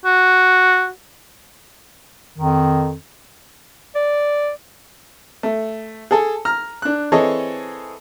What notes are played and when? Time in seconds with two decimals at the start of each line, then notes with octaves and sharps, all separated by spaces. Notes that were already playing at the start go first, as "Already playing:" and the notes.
0.05 F#4
2.38 F2 D#3
3.95 D5
5.43 A3
6.11 G#4 A4 G#5
6.45 A#5 F6
6.82 D4 F#6
7.12 E3 C4 G#4 A4 C#5 D#5